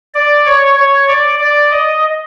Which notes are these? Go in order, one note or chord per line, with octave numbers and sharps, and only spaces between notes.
D5
C#5
C#5
D5
D5
D#5